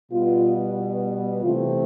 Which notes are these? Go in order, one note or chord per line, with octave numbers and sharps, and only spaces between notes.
B2 G3 B3 F4
C3 E3 A3 C4 F4